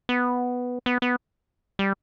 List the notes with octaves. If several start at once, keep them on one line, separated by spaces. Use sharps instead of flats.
B3
B3
B3
G3